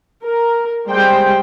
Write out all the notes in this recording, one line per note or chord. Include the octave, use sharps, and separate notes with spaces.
A#4
G3 G#3 C5 G5